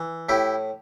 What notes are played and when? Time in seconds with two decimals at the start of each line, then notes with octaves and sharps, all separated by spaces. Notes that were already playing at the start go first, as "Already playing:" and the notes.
Already playing: E3
0.29 A2 E4 G4